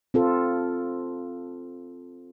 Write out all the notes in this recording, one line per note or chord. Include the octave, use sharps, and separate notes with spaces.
C4 F4 A4